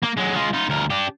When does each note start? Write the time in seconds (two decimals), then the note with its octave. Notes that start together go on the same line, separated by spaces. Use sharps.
0.03 A#3
0.18 F#3 G#3
0.36 G#3 F4
0.54 D#4 F4
0.69 D2 A#4
0.90 D4 G4